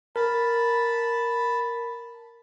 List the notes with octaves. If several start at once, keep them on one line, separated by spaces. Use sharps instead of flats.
A#4 A5 B5